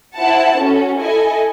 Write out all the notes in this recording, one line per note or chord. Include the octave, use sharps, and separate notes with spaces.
E4 C5 F#5 A5
C#4 F#4 A4
E4 A4 D#5 G#5